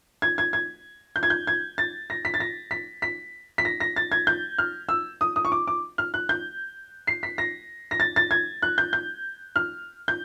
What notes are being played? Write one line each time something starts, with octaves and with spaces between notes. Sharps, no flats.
G#6
G#6
G#6
G6
G#6
G6
G#6
A6
A#6
B6
A6
A#6
B6
B6
B6
A#6
A#6
A6
G#6
G6
F6
E6
D#6
D#6
C#6
D6
D6
F6
F#6
G6
C7
B6
A#6
A#6
A6
A6
G#6
F#6
G6
G6
F6
G6